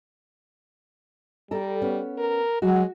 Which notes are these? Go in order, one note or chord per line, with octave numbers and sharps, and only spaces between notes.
G3 A4 A#4
B3 C#4
A#4
F#3 G#3 F#4